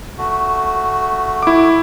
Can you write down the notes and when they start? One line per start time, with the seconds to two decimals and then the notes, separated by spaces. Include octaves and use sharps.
0.18 A3 F#4
1.43 E4 D6